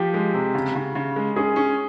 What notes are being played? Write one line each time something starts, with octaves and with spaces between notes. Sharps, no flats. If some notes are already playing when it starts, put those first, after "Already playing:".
Already playing: F3 G4
G#3
C3
C#3
C#3
C#3
G#3
C#4 G#4
C#4